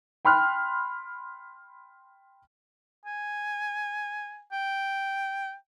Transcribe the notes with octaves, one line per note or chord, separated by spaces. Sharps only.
G5 B5 C6 F6 F#6
G#5
G5